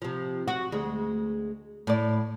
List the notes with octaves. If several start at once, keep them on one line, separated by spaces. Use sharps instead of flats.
C3 F3
F#4
D2 G#3
A2 D5